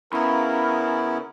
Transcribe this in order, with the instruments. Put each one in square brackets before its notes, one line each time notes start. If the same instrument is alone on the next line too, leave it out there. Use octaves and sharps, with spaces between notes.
[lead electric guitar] C#3 [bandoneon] B3 E4 [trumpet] A#4 [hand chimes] A#5 B5